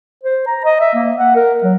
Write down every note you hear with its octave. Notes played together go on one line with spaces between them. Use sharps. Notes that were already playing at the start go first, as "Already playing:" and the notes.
C5
A#5
D#5
E5
A#3
F#5
A#4
F#3